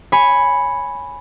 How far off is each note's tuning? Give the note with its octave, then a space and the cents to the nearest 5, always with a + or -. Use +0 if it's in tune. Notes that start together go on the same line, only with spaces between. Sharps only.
C#5 +0 G#5 +0 B5 +0